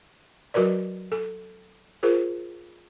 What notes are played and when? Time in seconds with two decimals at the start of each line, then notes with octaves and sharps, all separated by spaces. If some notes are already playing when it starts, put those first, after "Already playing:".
0.54 F#3 F#4 A#4 B4 D5
1.12 A4
2.03 F4 G#4 A#4 C5